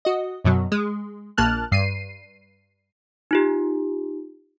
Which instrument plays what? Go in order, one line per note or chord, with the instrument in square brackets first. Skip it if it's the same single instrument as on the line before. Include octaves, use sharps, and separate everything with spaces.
[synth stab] F#4 D#5
F#2 B2 F#3
G#3
A#1 A#3 A5 F6 F#6
G2 C7 D#7
[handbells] D#4 F4 G4